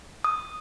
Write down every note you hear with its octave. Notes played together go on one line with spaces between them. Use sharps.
D#6